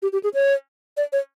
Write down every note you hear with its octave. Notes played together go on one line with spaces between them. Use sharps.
G4
G4
G#4
C#5
D5
C#5